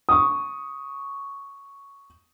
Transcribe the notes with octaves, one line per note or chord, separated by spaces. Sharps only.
C#6 D#6